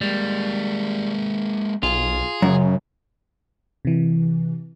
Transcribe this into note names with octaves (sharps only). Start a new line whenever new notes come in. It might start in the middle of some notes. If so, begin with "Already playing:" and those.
G3 G#3 A#3
B1 F4 G#4
F#2 C#3
C3 E3